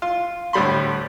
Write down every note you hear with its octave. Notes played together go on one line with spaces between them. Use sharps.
F4
D2 A2 G3 B5 C6